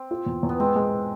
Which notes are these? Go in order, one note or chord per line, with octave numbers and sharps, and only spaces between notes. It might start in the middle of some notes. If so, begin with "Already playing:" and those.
Already playing: C4
F4
E2
E2
B3
G#3 C4
G#3